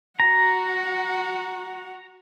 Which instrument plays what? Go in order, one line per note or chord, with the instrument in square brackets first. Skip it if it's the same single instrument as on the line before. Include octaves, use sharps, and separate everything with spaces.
[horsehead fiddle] F#4 F#5 [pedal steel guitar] A#5